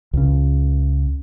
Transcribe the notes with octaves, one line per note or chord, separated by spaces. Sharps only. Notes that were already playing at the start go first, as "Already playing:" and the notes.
C#2 C#3